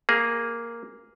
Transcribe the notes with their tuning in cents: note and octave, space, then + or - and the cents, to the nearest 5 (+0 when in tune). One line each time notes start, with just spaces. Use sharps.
A#3 +0 G#4 +0